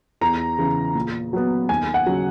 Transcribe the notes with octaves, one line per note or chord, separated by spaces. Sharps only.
E2 A#5
C#3 E3
A#2
F#3 B3
D#2 G#5
F#5
C#3 F#3